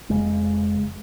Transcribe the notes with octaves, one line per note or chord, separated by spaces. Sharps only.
F1 F2 C#3 G#3